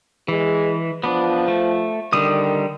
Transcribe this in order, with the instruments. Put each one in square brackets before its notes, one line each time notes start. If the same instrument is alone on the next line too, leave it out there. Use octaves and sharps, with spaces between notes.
[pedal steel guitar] E3 [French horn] G#3
[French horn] F3 [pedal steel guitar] B3 D4
[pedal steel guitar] A3
[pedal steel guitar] D3 G3 D#6 [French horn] D#3